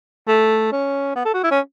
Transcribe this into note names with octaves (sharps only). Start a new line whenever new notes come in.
A3
C#4
B3
A4
F#4
E4
C#4